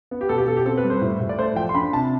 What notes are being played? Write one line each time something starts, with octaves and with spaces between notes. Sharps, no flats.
B3
G4
B2 A4
G4
B2 A4
G4
C4 A4
B4
G3
C5
A2
A2
D5
A3 C5
F3 G5
C6
D4 B5
C3 A5